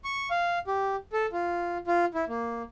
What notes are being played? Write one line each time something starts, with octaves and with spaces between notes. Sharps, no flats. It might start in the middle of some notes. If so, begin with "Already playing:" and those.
C#6
F5
G4
A4
F4
F4
E4
A#3